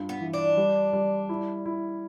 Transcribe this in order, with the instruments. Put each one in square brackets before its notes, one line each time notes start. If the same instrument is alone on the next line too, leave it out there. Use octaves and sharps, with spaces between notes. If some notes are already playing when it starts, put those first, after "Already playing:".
Already playing: [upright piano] G2 F4
[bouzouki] B3
[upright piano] E3
[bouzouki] D4
[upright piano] G3
G3
E4
E4